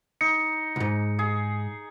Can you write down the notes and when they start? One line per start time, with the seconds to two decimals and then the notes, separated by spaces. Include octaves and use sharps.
0.21 D#4 C#7
0.76 C2 G#2
1.19 G#4